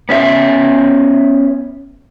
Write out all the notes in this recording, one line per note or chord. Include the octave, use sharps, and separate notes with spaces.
B3 C#4 G4 E5